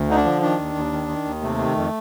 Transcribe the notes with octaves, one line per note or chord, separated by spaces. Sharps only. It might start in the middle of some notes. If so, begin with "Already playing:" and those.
Already playing: D2
D3 D#4
D4
F3
D#3 D4
D#2
D#2
D#3
D#3
D#2
C3 A3
D#3
F2